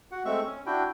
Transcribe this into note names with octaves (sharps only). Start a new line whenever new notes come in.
F#4 F#5
G#3 A3 C4 E5 C#6
C#4
D4 E4 F#4 G5